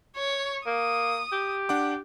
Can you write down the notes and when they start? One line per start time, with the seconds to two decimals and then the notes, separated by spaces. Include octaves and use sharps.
0.16 C#5
0.66 A#3 D#6
1.32 G4
1.69 D4 F#5 D6